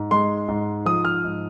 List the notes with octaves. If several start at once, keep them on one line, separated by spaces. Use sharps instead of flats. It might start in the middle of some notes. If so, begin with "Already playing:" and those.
Already playing: G#2
G#3 C6
G#2
F3 D#6
F6
G#2